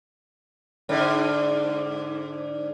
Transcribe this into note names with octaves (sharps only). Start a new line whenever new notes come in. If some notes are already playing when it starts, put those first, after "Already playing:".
G#2 D3